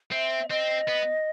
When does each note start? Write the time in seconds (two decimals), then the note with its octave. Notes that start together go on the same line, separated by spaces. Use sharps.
0.12 C4 E5
0.50 C4 D#5
0.88 B3